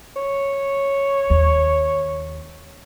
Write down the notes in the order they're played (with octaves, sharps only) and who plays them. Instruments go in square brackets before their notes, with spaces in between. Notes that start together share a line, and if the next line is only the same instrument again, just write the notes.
[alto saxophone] C#5
[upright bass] D#2